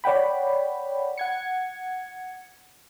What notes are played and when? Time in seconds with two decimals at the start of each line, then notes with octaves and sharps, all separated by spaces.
0.04 C#5 D5 F#5 G5 B5
1.18 F#5 G#6 C#7